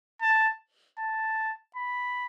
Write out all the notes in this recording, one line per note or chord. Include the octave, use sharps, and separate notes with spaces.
A5
A5
B5